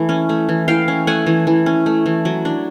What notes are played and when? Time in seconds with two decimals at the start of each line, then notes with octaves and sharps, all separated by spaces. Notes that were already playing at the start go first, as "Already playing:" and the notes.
Already playing: E3 A3
0.09 C#4
0.29 A3
0.49 E3
0.68 E3 F5 G5
0.88 C#4
1.07 A3 F#5 G#5
1.26 E3
1.47 E3
1.66 C#4
1.86 A3
2.06 E3
2.25 F#3
2.45 D4